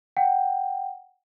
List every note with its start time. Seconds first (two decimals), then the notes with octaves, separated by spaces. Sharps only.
0.17 F#5 G5